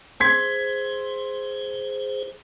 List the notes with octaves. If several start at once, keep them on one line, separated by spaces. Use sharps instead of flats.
G#4 C5 C6 G#6 B6